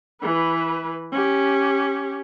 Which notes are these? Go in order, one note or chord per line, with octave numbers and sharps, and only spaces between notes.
E3 B4
C#4 G4